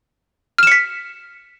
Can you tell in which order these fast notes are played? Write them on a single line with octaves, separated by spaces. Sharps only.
F6 E7 C#7 B6